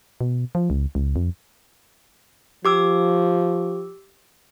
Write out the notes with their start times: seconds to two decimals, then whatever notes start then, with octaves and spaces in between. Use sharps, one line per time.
0.21 B2
0.55 F3
0.70 C#2
0.95 C#2
1.16 F2
2.65 F3 G4 D6 E6